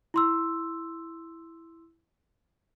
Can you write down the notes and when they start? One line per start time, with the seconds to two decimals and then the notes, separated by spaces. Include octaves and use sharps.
0.14 E4 C6 E6